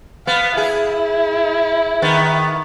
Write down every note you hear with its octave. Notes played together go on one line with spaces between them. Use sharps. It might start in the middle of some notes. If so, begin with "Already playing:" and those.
B3 F5
E4 G#4
D#3 B3